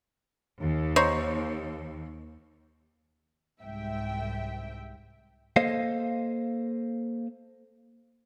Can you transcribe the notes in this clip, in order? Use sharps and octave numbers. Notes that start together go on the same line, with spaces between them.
D#2
D#4 C5 C#5
C2 G#2 E5 G5
A#3 A4 C5 D#5 F5